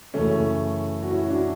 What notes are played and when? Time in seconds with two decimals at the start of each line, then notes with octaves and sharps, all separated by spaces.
0.14 F#2 C#3 E3 A3 C#4
1.03 F#4
1.11 C#4 E4
1.29 D4 F#4